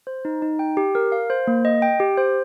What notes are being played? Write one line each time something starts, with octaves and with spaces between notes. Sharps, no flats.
C5
D#4
D#4
G5
G4
A#4
F5
C5
A#3
D#5
G5
G4
C5